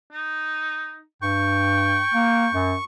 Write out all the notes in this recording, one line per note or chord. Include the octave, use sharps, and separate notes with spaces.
D#4
G2 G5 C#6
A#3
F#2